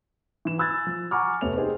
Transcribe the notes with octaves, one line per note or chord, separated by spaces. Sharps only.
E3 E7
G#5 B5 E6 F#6 G#6 A6
F3
F#5 G#5 A#5 C#6 D6 F6
F1 C3 A3 B3 C#5 F7
D#4 G4 G#4 C5 D#5